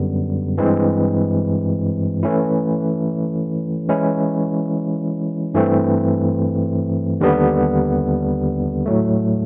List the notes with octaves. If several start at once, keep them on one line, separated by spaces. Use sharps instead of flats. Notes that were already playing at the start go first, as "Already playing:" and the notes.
Already playing: F#2 D3 G3 B3
G2 E3 G#3 C4
E3 A3 C#4 E4
E3 G#3 C#4 E4
G2 E3 A3 C4
D#2 D3 G3 B3
A2 F#3 A3